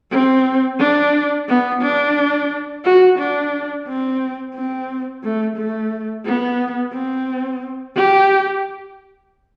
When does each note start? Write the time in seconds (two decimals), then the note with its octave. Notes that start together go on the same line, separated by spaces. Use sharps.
0.11 C4
0.79 D4
1.48 B3
1.82 D4
2.85 F#4
3.19 D4
3.87 C4
4.55 C4
5.23 A3
5.57 A3
6.26 B3
6.93 C4
7.96 G4